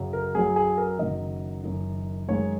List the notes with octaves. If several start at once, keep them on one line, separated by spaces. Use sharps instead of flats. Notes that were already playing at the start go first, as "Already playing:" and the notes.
Already playing: F#2 C#3 F#3
A#4
F#2 F#3 G#4
G#4
A#4
F#1 F#2 D#3 F#3 D#5
F#1 F#2 D#3
F#2 D#3 G#3 C#5